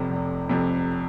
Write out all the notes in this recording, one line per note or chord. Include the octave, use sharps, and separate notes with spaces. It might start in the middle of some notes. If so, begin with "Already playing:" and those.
Already playing: F1 F2 C3
F1
F2 C3